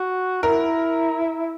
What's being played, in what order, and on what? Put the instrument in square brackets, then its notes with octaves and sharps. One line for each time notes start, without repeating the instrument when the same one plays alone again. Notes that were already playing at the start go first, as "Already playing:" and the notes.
Already playing: [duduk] F#4
[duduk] E4 [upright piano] A#4